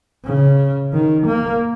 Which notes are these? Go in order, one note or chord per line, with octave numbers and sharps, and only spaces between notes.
C#3
D#3
A#3